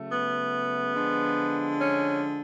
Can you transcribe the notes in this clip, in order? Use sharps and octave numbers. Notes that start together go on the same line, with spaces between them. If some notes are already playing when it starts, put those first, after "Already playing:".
Already playing: C#3 F#3 A3
B3
D3 F3 G#3
C#4